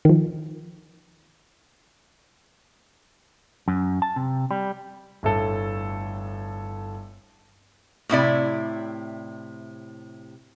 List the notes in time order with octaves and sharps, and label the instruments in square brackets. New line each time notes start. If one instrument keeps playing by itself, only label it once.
[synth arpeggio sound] D#3 F3
[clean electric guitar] F#2
A5
C3
G3
[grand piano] G1 A2 A3 A4
[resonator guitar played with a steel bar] A2 C3 E4 D5